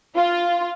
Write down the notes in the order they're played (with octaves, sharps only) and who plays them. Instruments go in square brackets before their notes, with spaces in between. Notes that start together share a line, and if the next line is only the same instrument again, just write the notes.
[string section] F4